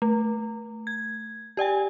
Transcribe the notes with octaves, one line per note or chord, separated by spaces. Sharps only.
A3
G#6
G4 D5 G5 G#5